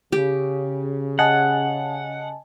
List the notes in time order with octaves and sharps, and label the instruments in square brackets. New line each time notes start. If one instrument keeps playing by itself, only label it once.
[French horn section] C#3 [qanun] G4
[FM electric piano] D#5 G#5 A5 [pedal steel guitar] F#5